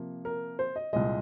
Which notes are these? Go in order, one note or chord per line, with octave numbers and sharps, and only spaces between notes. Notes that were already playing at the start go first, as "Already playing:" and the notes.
Already playing: C3 F3 A#3
A#4
C5
D#5
C2 A#2 G#3 D#5